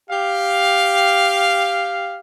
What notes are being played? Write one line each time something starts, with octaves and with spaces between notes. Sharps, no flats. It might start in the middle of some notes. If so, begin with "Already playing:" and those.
G4 F5